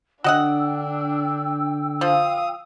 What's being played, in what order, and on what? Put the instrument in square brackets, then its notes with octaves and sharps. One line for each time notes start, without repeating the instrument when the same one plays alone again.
[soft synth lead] D3 [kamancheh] D4 [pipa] F#4 D#5 F#5 [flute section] G5 E6
[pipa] F3 [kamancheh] F5 D#6